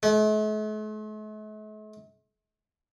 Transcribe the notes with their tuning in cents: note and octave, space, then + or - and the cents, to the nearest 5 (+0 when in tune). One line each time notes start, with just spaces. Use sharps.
A3 -45